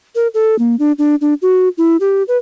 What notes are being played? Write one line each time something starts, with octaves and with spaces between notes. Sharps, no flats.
A#4
A4
A#3
D4
D4
D4
F#4
E4
G4
B4